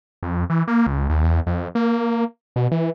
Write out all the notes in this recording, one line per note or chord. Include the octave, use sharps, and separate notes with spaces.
F2
E3
A#3
C#2
D#2
E2
F2
A#3
B2
E3